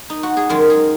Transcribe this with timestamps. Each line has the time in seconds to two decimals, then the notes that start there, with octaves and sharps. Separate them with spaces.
0.10 D#4
0.23 F#4
0.37 G#4
0.49 F#2 D#3 G#3 A#4
0.70 G#4